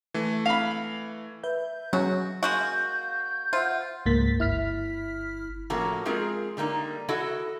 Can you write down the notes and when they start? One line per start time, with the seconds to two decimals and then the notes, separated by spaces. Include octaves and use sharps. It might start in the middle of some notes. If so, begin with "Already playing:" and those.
0.14 E3 A3
0.46 F5 B5
1.43 B4 E5 G6
1.93 F#3 C#4 F#4
2.43 G#3 A#3 F#4 F5 G6
3.53 F4 C5 E5 F#5
4.06 C#2 G#2 A#3 A6 B6
4.39 G1 E4 F6 B6
5.70 A2 F3 A#3 C#4 F#4 A4
6.05 G#3 C4 F4 G#4 A#4
6.57 D3 G3 A#3 D#4
7.08 E4 F#4 A4 D#5 F#5